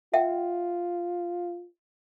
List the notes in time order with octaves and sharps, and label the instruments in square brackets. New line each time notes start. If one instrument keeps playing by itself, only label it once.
[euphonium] F4 [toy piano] E5 F#5 G5